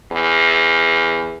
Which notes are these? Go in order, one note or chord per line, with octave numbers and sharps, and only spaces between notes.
E2